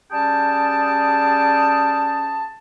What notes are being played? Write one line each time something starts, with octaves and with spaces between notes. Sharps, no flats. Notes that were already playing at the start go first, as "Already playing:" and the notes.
G3 C#4 G#4 G5 A5